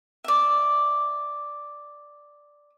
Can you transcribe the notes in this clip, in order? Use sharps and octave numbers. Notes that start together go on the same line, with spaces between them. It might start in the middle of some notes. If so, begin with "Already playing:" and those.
D5 E5